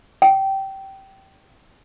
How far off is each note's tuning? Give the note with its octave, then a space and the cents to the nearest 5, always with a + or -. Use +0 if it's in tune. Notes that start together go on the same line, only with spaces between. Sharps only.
G5 -15